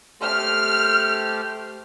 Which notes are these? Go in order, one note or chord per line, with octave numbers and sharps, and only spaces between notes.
A3 G4 C5 F6